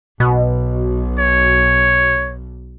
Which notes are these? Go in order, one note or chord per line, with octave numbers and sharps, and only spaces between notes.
B1 B2
C#5